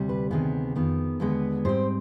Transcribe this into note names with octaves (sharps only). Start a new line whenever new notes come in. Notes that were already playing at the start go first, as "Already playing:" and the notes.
Already playing: D2 C3 G3
B4
D2 C3 D#3 B3 G#4
F2 D#3 B3
D#2 D3 G#3 B3 B4
G#2 G3 C4 C5